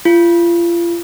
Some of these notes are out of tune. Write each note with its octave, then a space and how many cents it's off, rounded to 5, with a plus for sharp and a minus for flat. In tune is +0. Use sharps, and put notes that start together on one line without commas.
F4 -35